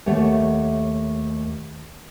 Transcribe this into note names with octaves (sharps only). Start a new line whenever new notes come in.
D#2 A3 C#5 F#5